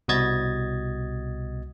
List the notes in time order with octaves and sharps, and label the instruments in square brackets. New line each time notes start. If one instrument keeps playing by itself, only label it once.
[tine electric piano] C2 B2 F#4 D#5 G#6 A6